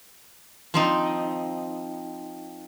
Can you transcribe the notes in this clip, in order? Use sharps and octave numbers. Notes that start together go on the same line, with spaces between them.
F3 C4 D#4